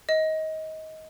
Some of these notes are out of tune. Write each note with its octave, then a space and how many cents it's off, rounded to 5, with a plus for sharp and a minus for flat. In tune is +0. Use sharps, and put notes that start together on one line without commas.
D#5 +20